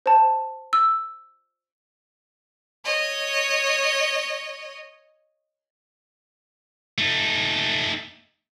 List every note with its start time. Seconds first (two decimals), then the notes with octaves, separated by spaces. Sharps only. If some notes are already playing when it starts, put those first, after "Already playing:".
0.06 C5 A5
0.73 E6
2.85 C#5 D#5
6.98 A3 D#4